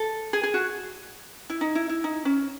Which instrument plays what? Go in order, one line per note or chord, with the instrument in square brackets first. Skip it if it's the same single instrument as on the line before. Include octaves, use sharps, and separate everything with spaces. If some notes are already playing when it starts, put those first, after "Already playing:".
Already playing: [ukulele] A4
G#4
G#4
F#4
E4
D#4
E4
E4
D#4
C#4